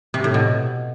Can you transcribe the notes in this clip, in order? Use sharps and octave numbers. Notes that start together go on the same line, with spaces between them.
C3
A2
B2